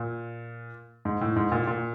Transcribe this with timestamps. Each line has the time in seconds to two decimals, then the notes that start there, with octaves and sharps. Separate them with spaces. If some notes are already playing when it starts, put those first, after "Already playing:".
Already playing: A#2
1.05 G#2
1.21 A2
1.36 G#2
1.52 A#2
1.67 A#2